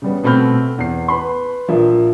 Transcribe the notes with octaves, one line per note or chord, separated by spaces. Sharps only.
C#3 G3 B3
B2 A3 C4 B5 F6 G6
E2 C7
B4 B5 C6
A#1 F3 A#3 E5